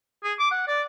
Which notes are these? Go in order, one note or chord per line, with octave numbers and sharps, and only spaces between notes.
G#4
D6
F#5
D5